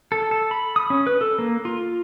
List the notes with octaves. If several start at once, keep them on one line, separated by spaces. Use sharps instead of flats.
A4
A4
B5
D#6
C#4
B4
A4
A#3
F4